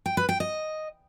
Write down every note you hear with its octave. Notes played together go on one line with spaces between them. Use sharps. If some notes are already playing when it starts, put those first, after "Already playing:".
G5
B4
G5
D#5